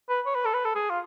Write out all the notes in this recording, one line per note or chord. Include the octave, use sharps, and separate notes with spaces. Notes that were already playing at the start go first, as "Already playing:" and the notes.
B4
C#5
B4
A4
B4
A4
G#4
F4